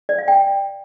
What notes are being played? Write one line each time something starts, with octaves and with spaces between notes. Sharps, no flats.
D5
F5
G5